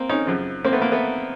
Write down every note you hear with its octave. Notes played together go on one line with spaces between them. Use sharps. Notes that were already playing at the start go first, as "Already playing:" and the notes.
Already playing: A#3 C4
C#4 D#4
F#2 C#3 F3
A#3 C4
A3 B3
A#3
A3 B3